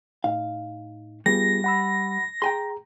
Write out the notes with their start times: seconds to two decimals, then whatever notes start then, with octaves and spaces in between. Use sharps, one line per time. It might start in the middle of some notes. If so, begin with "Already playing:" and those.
0.24 A2 D#4 F5
1.26 G3 B3 F4 G#4 A#6
1.64 F#5 B5 E6
2.42 G#4 G5 G#5 A#5 C6